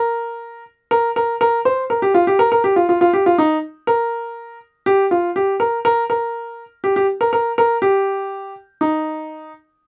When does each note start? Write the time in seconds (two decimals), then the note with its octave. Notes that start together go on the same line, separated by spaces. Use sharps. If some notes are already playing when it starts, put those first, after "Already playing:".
Already playing: A#4
0.91 A#4
1.16 A#4
1.41 A#4
1.65 C5
1.90 A#4
2.02 G4
2.14 F4
2.27 G4
2.39 A#4
2.52 A#4
2.64 G4
2.76 F4
2.89 F4
3.01 F4
3.13 G4
3.26 F4
3.38 D#4
3.87 A#4
4.86 G4
5.11 F4
5.36 G4
5.60 A#4
5.85 A#4
6.10 A#4
6.84 G4
6.96 G4
7.21 A#4
7.33 A#4
7.58 A#4
7.82 G4
8.81 D#4